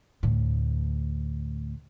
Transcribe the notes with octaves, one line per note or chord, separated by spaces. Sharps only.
D2 A2